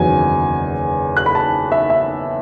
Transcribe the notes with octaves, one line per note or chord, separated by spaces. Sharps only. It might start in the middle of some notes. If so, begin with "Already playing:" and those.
Already playing: F#1 E2 D#3 F#3 G#5
F#6
B5
A5
E5
E5